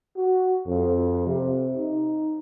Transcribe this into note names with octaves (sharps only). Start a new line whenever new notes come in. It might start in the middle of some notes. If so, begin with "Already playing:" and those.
F#4
F2
C3
D#4